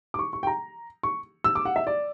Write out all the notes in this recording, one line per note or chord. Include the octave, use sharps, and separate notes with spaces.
D6
C#6
C#6
G5
A#5
C#6
E6
D6
F#5
E5
D5